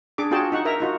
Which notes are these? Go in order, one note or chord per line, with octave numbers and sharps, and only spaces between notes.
D4 G#4 D6
D4 F4 F#4 G#4 G5 A5
D#4 F#5 C#6
A#4 E5 A#5
D#4 F4 F#4